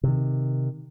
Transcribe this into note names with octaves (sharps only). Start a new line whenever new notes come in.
C3 D#3